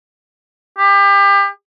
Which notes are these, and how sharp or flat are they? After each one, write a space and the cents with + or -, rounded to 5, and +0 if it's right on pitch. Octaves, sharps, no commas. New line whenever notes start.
G4 +30